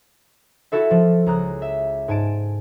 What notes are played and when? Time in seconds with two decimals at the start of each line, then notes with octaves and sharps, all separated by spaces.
0.72 E4 F#4 A4 E5
0.91 F3
1.26 C#2 A#5 D#6 F#6
1.62 E5
2.08 G#2 G#5 A5 D7